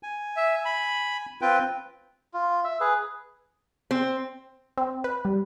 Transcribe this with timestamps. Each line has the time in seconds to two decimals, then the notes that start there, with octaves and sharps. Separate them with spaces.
0.03 G#5
0.37 E5
0.65 B5
1.41 C4 F4 B4 G5
2.34 F4
2.64 E5
2.81 G#4 B4
3.91 C4
4.77 C4
5.04 B4
5.25 G3